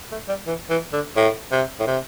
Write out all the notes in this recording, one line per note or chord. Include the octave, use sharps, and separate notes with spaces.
A3
G3
E3
E3
D3
A2
C3
A2
C3